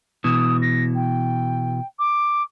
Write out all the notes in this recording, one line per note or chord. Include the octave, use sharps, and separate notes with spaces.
B2 E3 D#6
A#6
G5
D6